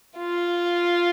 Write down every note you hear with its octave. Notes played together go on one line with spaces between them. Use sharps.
F4